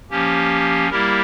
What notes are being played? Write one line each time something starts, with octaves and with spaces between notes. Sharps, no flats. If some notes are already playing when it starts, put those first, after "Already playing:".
F3 A#3 C#4 G4
G3 A#3 E4 G4 A#4